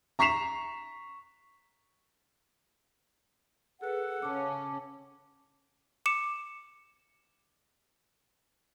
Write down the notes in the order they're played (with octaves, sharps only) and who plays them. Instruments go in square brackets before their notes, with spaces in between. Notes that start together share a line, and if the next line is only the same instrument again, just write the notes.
[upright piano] A#5 C#6 B6 C7 E7 F7
[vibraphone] G#4 B4 [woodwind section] A4 F#5
[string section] C#3 C#4 [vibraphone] A5 D6
[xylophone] D6 C#7 E7